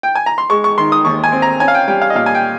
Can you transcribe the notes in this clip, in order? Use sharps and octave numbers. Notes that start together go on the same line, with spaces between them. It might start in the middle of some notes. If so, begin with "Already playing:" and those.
G5
G#5
A#5
C6
G#3 C#6
C#6
D#3 C6
D#6
D#2 C#6
G#5
C4
A#5
C#4 G#5
F5
G5
G3 G5
F5
D#5
A#2 F5
G#5
G5